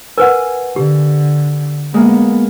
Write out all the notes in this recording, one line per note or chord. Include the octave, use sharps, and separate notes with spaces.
A#4 B4 F#5 G#5
D3 G4
G#3 A#3 B3